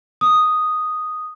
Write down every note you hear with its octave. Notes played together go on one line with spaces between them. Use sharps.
D#6